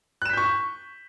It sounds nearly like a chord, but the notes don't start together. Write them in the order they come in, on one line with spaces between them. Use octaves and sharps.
F#6 E7 B6 G6 C#6